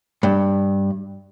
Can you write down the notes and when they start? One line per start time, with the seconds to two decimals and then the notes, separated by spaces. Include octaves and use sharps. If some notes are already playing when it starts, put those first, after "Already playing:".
0.23 G2